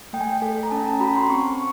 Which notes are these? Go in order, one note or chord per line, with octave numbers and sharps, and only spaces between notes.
A3 G5
G#5
G5
A4 G#5
A#5
C#4 A5
A#5
F#4 B5
C6
C4 C#6